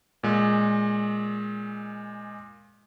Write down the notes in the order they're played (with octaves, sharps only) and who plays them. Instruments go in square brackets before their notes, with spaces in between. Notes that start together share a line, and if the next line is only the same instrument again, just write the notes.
[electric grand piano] A#2 G#3